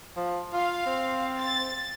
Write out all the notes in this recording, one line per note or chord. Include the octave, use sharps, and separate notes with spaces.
F3
F4 F5
C4
A6